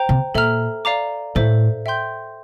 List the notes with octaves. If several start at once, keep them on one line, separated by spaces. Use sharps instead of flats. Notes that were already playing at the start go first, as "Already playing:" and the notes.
Already playing: C5 G5 A#5
C3
A#2 A4 E5 A#5 F6
D5 F5 A#5 D6
A2 A4 C5 E5
E5 G5 C6 G6